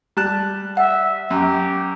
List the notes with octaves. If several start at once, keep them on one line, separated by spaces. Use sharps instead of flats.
G3 A5 F#6
E5 F#5
F#2 G4